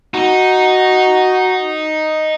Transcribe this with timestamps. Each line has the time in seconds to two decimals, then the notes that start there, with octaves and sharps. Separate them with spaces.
0.14 D#4 F#4